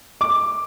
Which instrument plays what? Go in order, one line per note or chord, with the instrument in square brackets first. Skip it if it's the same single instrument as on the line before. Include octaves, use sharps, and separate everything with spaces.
[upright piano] D6